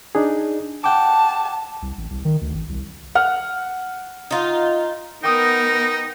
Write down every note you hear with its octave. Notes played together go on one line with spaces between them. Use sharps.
D4 D#4 G#4
F#5 G5 A5 D6
C2
A1
C2
D#3
D2
A1
C2
F#5 F6
D#4 F4
B3 D#4 A#4 G5 D#6